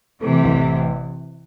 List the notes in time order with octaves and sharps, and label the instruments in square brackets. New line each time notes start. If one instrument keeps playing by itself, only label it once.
[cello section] C3 E3 [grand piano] A3
[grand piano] A1